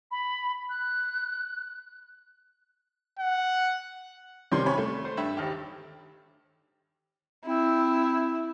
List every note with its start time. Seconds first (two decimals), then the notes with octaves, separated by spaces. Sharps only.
0.11 B5
0.69 F#6
3.19 F#5
4.52 C3 D#3 C#4 D5 G#5 C6
4.66 C3 C#4 C#5 B5
4.78 A3
5.05 C5
5.17 G2 E5 B5
5.37 G#1 D#2 G4
7.46 C4 E4